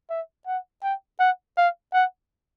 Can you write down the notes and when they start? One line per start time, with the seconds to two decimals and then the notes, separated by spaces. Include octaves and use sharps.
0.10 E5
0.47 F#5
0.83 G5
1.20 F#5
1.57 F5
1.94 F#5